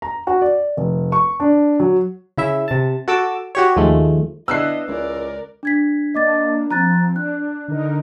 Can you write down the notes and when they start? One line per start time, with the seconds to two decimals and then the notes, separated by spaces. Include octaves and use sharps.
0.02 A#5
0.27 F#4
0.42 D5
0.77 F1
1.12 C#6
1.40 D4
1.80 F#3
2.38 C#3 E4 E5
2.68 C3 A5
3.08 F#4 A4 D6 E6
3.55 F#4 G4 C#5
3.76 D#2 F3 G#3 A3
4.48 B3 D4 E4 D#5 E6 F#6 C7
4.88 C#2 E4 A#4 D5
5.63 D4 G#6 B6
6.15 A#3 D4 D#5 D6 A6
6.71 F3 C4 A#5 F#6 A6
7.16 D4 F#6
7.68 D3 D#4 A#4